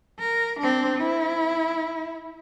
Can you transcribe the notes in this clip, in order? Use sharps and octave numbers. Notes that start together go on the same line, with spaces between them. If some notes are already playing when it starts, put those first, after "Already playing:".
A#4
C4 D4
E4